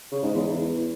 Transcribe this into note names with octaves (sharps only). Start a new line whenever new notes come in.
C#3
G#2
E2